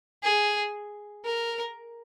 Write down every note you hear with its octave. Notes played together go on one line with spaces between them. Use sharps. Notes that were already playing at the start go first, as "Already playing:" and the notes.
G#4
A#4